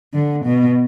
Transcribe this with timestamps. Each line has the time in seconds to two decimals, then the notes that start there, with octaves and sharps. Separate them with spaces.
0.14 D3
0.45 B2